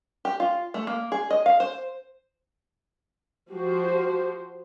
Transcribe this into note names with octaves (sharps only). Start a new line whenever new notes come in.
G4
F4
A3
A#3
G#4
D#5
F5
C5
F3 F#4 G4 C5